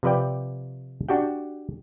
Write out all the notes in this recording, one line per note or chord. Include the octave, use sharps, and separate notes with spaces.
C3 F3 B4 D5 G5
D4 F#4 G4 G5